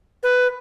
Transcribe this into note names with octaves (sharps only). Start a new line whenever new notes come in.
B4